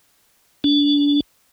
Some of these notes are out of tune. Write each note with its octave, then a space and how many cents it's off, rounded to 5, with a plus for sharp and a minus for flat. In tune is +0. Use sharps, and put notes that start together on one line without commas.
D4 -30